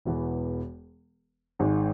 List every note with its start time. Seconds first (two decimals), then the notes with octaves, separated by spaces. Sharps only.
0.05 E1 E2 E3 B3
1.59 G#1 G#2 G#3